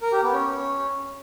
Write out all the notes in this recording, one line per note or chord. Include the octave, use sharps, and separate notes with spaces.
A#4
G4
B3
C#4